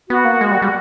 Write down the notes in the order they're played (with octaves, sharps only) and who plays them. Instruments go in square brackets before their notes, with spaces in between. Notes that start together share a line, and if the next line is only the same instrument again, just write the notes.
[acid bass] B3 [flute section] F#4
[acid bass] A#3
G#3
G3
G3